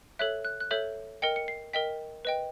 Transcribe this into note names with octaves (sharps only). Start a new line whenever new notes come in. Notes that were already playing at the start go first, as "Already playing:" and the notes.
A4 C#5 E5 F#6
F#6
F#6
A4 C#5 E5 G6
A#4 D#5 G5 C#7
C#7
C7
A#4 D#5 G5 B6
B4 D#5 G5